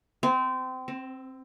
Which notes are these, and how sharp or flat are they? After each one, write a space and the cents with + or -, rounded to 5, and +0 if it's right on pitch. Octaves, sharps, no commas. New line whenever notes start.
C4 -25
C4 +15